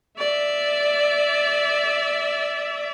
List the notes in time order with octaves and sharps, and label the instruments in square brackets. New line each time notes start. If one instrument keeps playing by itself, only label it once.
[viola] D5 E5